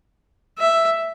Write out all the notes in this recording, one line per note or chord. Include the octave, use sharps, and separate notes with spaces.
E5